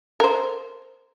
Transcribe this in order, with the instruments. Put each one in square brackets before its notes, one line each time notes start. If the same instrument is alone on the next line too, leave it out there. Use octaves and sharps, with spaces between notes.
[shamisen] A#4 C5